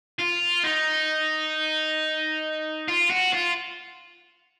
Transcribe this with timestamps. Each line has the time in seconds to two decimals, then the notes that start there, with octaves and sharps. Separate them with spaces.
0.19 F4
0.64 D#4
2.88 F4
3.11 F#4
3.34 F4